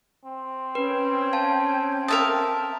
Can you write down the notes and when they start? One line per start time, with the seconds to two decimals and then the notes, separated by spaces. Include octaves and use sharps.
0.24 C4
0.75 C#4 B4 G5
1.33 F5 A5
2.08 A#4 E5 A5 D#6